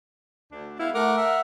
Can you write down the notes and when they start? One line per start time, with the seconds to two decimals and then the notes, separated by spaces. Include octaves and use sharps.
0.52 D2 D4
0.80 G#3 B3 E4 F5
0.95 A3 A#4 F#5 D6
1.17 E5 F#5